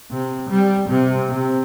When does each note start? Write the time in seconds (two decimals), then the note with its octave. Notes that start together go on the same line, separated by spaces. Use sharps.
0.11 C3
0.50 G3
0.89 C3
1.29 C3